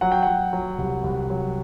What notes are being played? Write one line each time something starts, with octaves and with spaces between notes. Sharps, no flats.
F#3 F#5
G5
F#3 F#5
F#3
C2
C2
F#3